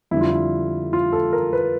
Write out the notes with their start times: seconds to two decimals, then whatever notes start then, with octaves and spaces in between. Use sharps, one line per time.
0.11 F2 D3 G3 E4
0.21 F4
0.30 E4
0.93 F4
1.13 A4
1.33 A#4
1.53 B4